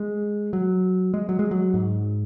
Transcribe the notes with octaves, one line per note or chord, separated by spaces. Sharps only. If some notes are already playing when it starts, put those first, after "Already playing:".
Already playing: G#3
F#3
G#3
F#3
G#3
F#3
G#2